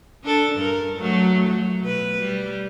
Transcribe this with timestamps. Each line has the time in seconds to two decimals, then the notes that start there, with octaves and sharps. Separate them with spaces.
0.23 D4 A4
0.55 G2 A#4
0.97 F#3 A3
1.47 F#3
1.84 B2 B4
2.20 G3